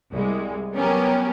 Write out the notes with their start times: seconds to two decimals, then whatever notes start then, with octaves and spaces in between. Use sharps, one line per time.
0.12 C2 G#3
0.76 F#3 B3 C#4 G4 A#4